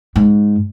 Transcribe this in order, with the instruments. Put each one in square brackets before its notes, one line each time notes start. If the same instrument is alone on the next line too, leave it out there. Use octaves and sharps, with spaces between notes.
[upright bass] G#2